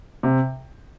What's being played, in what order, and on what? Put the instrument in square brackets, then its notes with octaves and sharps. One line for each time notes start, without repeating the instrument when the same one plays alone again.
[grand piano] C3